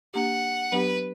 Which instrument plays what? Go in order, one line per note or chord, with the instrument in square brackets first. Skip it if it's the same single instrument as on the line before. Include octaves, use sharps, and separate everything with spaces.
[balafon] A#3 D4 G4 [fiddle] F#5
[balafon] F#3 B3 D4 G4 [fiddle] B4